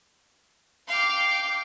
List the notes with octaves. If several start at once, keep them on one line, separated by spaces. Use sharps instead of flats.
F5 G5 D6